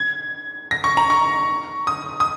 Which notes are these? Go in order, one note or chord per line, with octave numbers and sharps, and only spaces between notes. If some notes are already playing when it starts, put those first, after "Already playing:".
Already playing: G#6
A#6
C#6
A#5
C#6
D#6
D#6